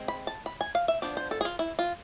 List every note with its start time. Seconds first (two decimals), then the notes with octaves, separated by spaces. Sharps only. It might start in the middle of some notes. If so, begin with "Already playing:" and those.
Already playing: G#3 C4
0.08 B5
0.27 A5
0.46 B5
0.61 G#5
0.75 F5
0.88 E5
1.02 F3 B3 D4 D5
1.17 C5
1.31 A4
1.41 G#4
1.45 F4
1.59 E4
1.79 F4